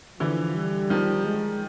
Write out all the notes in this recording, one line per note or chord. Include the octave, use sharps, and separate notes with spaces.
D3 E3 F3
G3
D#3 F3
G#3